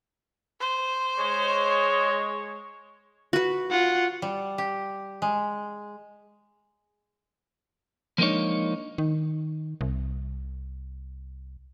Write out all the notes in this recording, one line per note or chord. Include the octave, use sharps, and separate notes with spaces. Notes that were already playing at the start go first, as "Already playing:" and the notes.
C5
G#3 C#5
F#4 B4
F4 F#5
G3
G4
G#3
F3 G#3 A#3 D4 D#4 C#5
D#3
C2